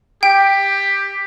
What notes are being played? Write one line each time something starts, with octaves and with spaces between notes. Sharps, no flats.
G4 G5